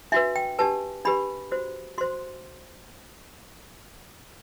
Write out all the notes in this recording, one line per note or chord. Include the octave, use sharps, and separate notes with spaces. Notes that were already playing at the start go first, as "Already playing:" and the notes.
D4 F#4 B4 E5
G5
D4 G4 B4 A5
D4 G4 B4 B5
F#4 C5
F#4 C5 C6